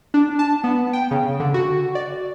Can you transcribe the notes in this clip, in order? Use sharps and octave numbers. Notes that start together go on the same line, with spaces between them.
D4
A5
B3
G5
C#3
D3
F#4
D5